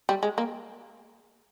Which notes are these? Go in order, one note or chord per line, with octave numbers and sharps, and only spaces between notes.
G3
G#3
A#3